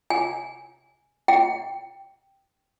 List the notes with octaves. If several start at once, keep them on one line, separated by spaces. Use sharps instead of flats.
G#5
G5